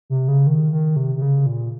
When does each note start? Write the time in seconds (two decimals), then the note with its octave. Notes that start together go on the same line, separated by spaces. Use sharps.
0.10 C3
0.28 C#3
0.47 D#3
0.72 D#3
0.96 C3
1.16 C3
1.22 C#3
1.46 A#2